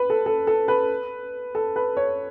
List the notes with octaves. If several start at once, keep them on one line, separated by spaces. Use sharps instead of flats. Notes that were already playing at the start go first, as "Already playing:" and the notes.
Already playing: B4
A4
A4
A4
B4
A4
B4
C#5